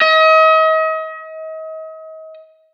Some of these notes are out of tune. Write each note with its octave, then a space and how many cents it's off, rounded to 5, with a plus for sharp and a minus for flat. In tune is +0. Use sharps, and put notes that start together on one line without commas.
D#5 +40